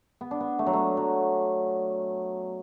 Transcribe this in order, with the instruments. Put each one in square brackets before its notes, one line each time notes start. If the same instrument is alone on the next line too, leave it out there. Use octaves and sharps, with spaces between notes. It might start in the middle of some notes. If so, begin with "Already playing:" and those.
[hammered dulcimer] B3
D4
B3
A3
F#3
A3
F#3